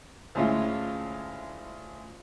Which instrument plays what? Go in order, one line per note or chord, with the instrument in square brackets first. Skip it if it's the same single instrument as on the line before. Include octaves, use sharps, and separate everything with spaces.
[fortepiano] D2 A2 G#3 C#4 E4 F4